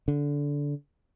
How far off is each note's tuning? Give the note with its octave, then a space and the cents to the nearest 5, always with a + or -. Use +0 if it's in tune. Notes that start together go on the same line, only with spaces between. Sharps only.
D3 -20